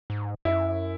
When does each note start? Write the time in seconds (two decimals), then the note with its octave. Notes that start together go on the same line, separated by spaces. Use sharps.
0.10 G#2
0.45 F#2 E4